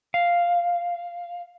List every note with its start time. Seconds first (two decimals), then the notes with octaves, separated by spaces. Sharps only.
0.14 F5